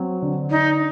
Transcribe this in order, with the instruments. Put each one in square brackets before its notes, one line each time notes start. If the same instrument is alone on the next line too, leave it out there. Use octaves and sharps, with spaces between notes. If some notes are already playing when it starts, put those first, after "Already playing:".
Already playing: [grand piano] F#3 C4
D3
[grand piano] D4 [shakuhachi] D#4